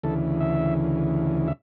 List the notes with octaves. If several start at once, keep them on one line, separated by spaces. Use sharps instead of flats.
D2 C#3 E3 A4
E5
E5